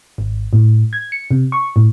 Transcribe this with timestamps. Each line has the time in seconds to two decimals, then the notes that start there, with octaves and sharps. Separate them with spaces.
0.18 G#1
0.53 A2
0.93 G#6
1.12 C#7
1.31 C3
1.52 C#6
1.76 A2